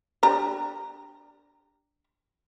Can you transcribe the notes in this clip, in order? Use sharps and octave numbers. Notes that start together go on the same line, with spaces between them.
D4 G4 A#5